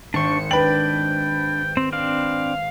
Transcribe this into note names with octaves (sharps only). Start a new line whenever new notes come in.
G#1 D4 C5 C#6 C#7
D4 B4 G5 F#7
C4
C4 D4 F5